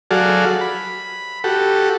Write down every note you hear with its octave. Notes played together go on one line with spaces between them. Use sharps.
F#3 F#4 G#4 A4 D5 F5
B5
F#4 G4 A4